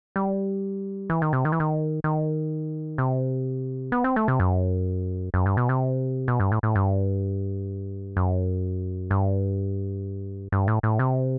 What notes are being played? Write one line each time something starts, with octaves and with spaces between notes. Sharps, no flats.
G3
E3
D#3
C3
D#3
E3
D#3
D#3
C3
B3
C4
A3
C3
F#2
F#2
G2
B2
C3
B2
G2
A2
A2
G2
F#2
G2
G2
A2
A2
C3